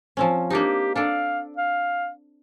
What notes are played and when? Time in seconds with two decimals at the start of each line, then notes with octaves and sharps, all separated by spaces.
0.17 F3 C4 C#4
0.50 A#3 D4 D#4 G4
0.96 D4 A4 D5 F5
1.57 F5